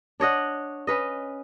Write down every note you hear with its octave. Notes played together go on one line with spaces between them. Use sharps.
D4 C#5 D#5 F#5
C#4 B4 D#5